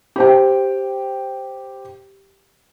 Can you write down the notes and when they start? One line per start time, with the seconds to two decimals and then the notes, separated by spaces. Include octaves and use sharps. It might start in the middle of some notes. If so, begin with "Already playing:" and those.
0.16 G4 C5 G5